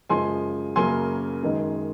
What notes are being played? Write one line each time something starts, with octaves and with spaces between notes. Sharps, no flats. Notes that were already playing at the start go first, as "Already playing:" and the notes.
F#2 C#3 F3 G#3 G#5 C6
F#2 C#3 F#3 A#3 G#5 C6
F#2 D#3 G#3